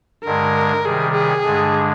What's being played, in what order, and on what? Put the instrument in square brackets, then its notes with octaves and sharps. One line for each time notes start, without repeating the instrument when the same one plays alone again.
[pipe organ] G2 D3 G#3 [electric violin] A#4
[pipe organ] C3 D#3 G3 [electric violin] G#4
[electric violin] G#4
[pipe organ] G2 D3 G#3 D4